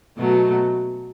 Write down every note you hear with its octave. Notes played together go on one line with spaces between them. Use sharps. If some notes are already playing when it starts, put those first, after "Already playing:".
B2 F#3 A3